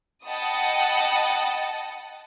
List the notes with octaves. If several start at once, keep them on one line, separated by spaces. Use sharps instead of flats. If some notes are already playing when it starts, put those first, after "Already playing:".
D#5 F#5 G5 A5 B5 D#6